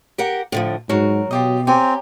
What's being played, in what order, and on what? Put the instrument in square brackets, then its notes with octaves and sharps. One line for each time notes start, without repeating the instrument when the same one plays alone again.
[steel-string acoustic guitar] G4 A#4 F#5
A2 D3 F3
[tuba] G#2 [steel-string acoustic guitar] F#3 F#4 [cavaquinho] A#4
[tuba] B2 [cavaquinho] F4 G4 D#5
[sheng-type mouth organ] C4 [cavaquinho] G4 C#5 A#5 [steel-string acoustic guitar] G#5